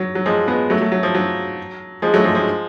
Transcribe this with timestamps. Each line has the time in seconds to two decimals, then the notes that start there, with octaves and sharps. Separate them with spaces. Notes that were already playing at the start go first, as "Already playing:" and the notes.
Already playing: F#3
0.15 F#3
0.26 F3 G#3
0.48 G#3 B3
0.70 F#3 A3
0.81 F#3 A3
0.92 F#3
1.03 F3
1.15 F#3
2.02 F3 G#3
2.14 F#3 A3
2.24 F3 G#3
2.35 F3 G#3